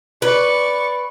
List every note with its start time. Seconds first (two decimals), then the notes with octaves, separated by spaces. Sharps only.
0.22 B4 D5 C#6